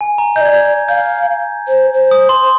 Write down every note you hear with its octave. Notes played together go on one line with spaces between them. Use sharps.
G#5
A#5
D#5 G6
D5 G#6
G6
F5 G6
C5
C5
D#6
C6